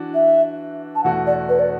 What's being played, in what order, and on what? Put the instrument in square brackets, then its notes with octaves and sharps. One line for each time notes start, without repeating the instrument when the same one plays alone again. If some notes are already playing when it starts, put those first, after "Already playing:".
Already playing: [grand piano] E3 D4 F#4
[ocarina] E5
A5
[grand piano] E2 B2 A3 F#4 [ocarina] F#5
[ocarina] D5
B4
D5